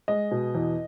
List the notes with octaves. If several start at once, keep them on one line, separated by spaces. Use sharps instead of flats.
G#3 D#5
B2
E2